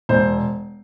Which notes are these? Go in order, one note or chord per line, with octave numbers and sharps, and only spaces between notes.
E1 C5